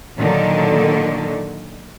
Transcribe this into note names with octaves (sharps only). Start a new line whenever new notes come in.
A#2 D3 D#3 F#3 A4